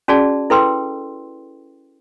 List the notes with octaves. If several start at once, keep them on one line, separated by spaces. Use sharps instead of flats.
C#4 F#4 G#4 D5 A5
E4 A4 B4 G5 C6 E6